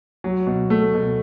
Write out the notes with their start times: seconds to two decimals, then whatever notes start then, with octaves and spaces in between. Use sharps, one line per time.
0.24 F#3
0.46 B2
0.70 A3
0.94 B2